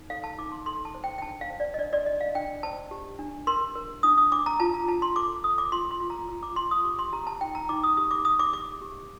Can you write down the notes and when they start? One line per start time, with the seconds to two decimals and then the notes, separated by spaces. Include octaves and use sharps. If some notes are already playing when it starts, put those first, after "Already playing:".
Already playing: D#4
0.10 A4 F5
0.24 A5
0.38 D#4 D6
0.52 C6
0.66 A4 C6
0.85 A5
0.94 C5
1.04 G5
1.18 G5
1.22 D4 A5
1.41 F5
1.50 C5
1.60 D5
1.74 D#5
1.78 D4 D5
1.93 D5
2.06 D4 D#5
2.21 F5
2.35 D4 G5
2.63 C5 A5
2.91 G4
3.19 D4
3.47 A#4 C6
3.75 A#4
4.03 D4 D#6
4.18 D#6
4.32 D4 D6
4.46 A#5
4.60 F4 A5
4.74 A#5
4.88 F4 A5
5.02 C6
5.16 A4 D6
5.44 A4 D#6
5.58 D6
5.72 F4 C6
5.91 C6
6.00 F4
6.10 A#5
6.29 F4 A#5
6.43 D6
6.56 F4 C6
6.71 D#6
6.85 G4 D6
6.99 C6
7.13 G4 A#5
7.27 A5
7.41 D#4 G5
7.55 A#5
7.69 D#4 D6
7.84 D#6
7.97 G4 D#6
8.11 D6
8.25 G4 D#6
8.39 D6
8.53 G4 D6
8.82 G4